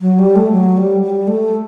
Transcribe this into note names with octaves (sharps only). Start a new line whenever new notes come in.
F#3
G3
A3
F#3
G3
G3
A3